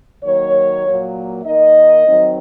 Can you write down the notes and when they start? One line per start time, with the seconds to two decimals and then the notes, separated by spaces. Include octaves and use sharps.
0.23 D#3 F#3 A#3 C#5
0.85 A#2 F#3 A#3
1.44 D#3 A#3 D#4 D#5
2.06 D#3 F#3 C4 D#4